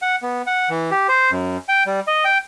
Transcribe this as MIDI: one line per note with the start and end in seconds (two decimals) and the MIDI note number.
0.02 0.16 78
0.22 0.42 59
0.47 0.69 78
0.70 0.90 52
0.91 1.07 67
1.09 1.31 72
1.31 1.57 42
1.69 1.83 79
1.86 2.00 55
2.07 2.24 75
2.25 2.38 79